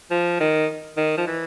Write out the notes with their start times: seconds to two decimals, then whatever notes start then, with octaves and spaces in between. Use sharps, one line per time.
0.11 F3
0.40 D#3
0.97 D#3
1.18 F3
1.27 E3